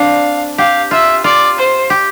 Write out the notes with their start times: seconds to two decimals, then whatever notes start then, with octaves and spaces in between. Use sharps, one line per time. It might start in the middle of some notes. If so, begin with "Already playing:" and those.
Already playing: C4 D4 F5
0.58 G4 F5
0.91 F4 E5
1.24 F4 D5
1.58 C5
1.90 G4